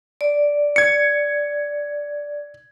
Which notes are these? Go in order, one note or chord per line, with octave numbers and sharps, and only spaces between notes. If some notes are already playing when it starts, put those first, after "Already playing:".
D5
G#6 C#7